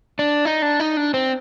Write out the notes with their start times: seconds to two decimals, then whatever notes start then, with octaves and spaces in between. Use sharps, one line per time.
0.19 D4
0.45 D#4
0.62 D4
0.80 D#4
0.97 D4
1.14 C4